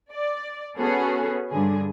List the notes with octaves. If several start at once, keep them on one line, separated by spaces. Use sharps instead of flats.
D5
B3 C#4 F#4 G#4 A4
G2 D3 G#4